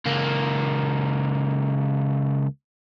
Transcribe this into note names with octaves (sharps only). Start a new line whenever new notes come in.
C#2 A#3